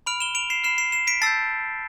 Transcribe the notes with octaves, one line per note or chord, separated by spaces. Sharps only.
B5 F6 D7 F7
E7 G7
D7 F7
C7 E7
B5 F6 C7 E7
C7 E7
C7 E7
B6 D7
A5 E6 G6 A6 C7